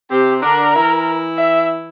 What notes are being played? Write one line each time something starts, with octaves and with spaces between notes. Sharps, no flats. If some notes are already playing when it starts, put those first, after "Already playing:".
C3 C4 G4
D3 D4 A#4
E3 E4
E5